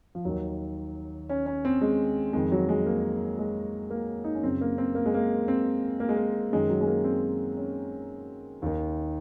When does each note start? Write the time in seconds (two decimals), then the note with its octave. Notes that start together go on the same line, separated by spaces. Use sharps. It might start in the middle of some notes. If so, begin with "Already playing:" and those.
0.15 F3
0.25 D#2 D#3 F#3
1.29 C#4
1.46 C#4
1.65 C4
1.81 G#3
2.33 F2 D#3 G#3
2.52 F#3
2.69 G#3
2.86 A#3
3.39 G#3
3.90 A#3
4.24 D#4
4.34 C#4
4.43 F#2 C#3 C4
4.61 A#3
4.78 C4
4.95 A#3
5.06 G#3
5.14 A#3
5.48 C4
6.00 A#3
6.09 G#3
6.17 A#3
6.53 F#2 D#3 G#3
6.70 F#3
6.81 G#3
6.87 A#3
7.04 C4
7.57 C#4
8.62 D#2 D#3